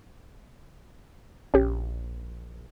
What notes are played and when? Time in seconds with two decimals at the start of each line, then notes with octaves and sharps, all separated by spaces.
1.54 A#1 C#4 G4